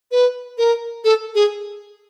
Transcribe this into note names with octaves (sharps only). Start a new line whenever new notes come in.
B4
A#4
A4
G#4